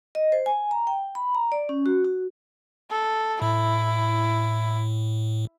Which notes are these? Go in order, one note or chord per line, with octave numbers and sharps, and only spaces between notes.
D#5
C5
G#5
A#5
G5
B5
A#5
D5
C#4
F#4
F#4
A4
A2 E4